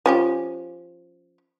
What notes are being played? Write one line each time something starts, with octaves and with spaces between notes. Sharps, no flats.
F3 C#4 G4